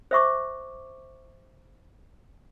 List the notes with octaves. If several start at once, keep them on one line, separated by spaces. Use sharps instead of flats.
C5 E5 C#6 D6